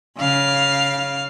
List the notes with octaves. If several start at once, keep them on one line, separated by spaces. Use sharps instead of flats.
C#3 F5